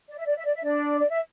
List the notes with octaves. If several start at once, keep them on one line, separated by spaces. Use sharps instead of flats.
D5
E5
D5
E5
D5
E5
D4 D5
D5
E5